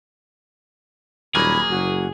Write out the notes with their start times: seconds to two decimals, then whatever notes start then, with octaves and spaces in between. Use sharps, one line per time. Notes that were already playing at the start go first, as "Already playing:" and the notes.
1.35 D#1 F#3 A#3 G#4 B5
1.70 F#1 F#4